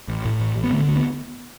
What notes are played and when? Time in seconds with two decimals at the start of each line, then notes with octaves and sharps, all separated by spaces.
0.08 A1
0.25 A2
0.40 A1
0.56 A1
0.63 B3
0.72 D3 A3
0.88 D2
0.96 B3